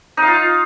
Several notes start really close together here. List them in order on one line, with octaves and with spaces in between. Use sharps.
D#4 F5 F4